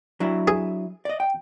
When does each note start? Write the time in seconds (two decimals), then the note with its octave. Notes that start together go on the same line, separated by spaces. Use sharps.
0.20 F#3 D4 E4
0.48 G#4
1.05 D5 D#5
1.20 G5